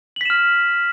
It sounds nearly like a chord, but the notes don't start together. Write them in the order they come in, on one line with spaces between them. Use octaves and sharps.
F#7 B6 E7 F6